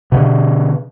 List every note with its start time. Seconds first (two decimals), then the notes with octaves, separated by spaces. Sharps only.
0.12 B2 D3